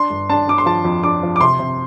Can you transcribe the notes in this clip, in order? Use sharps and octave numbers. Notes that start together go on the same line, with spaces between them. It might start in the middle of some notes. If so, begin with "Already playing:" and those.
Already playing: D4 C6
G1
D4 A5
D4 D6
C6
F3 A5
F2
D4 D6
F3
D6
C3 C6
C3